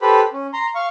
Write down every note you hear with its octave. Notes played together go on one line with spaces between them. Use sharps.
G4 A4 B4 C5 B5
C#4
A#5 C6
F5 C#6